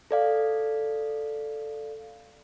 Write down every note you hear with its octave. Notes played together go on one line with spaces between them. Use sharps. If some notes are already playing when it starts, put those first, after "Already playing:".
A4 D5 F5